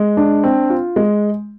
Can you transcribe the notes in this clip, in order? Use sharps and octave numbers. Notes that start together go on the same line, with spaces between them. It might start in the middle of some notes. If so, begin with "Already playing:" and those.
Already playing: G#3
D4
C4
F4
G#3